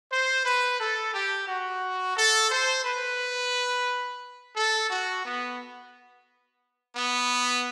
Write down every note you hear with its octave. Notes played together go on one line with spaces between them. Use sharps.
C5
B4
A4
G4
F#4
A4
C5
B4
A4
F#4
B3
B3